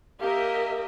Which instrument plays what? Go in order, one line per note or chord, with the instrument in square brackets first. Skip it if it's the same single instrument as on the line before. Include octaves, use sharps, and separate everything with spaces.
[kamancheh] A#3 A#4 [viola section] G4 D#5 E5